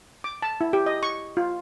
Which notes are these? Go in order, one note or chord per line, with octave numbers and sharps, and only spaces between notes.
D6
A5
E4
G4
D#5
C#6
F4